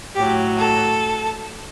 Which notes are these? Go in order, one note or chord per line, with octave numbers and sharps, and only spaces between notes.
A2 F#3 G4
A4